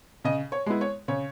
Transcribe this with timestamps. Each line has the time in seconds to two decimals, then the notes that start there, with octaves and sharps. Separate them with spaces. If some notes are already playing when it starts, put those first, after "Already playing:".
0.25 C#3 D#5
0.52 C#5
0.66 G#3 B3 E4
0.81 C#5
1.08 C#3 C#5